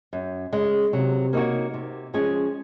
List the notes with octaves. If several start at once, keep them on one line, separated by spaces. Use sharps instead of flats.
F#2
C#3 G#3
C3 F#3
A#3 D#4 F#4 C#5
C3
F3 G#3 C#4 G#4